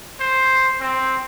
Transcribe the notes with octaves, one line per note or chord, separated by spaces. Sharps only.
C5
C4